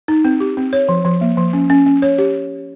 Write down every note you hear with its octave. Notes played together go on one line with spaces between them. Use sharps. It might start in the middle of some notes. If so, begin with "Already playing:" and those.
D#4
C4
G4
C4
C#5
F3
F3
A#3
F3
C#4
C#4
C#4
C#5
G4